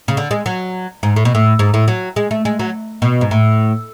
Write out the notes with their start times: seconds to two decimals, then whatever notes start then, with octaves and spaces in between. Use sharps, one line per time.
0.08 C#3
0.17 D3
0.31 G#3
0.46 F#3
1.03 G#2
1.16 A2
1.25 B2
1.35 A2
1.59 G#2
1.74 A2
1.88 F#3
2.16 G#3
2.31 A3
2.45 G#3
2.59 F#3
3.02 B2
3.21 G#2
3.31 A2